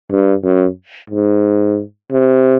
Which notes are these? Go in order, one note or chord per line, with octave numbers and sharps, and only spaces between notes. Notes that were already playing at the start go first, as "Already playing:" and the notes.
G2
F#2
G#2
C3